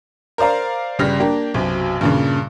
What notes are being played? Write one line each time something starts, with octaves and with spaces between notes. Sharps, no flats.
A#4 C5 D5 F5 A#5
G1 C#3 G3 F6 A#6
A#3 D4 G4
B1 F#2 C3
G2 A#2 C#3